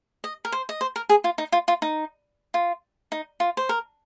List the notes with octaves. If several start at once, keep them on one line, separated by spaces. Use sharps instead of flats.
D#5
A#4
C5
D#5
C5
A#4
G#4
F4
D#4
F4
F4
D#4
F4
D#4
F4
C5
A#4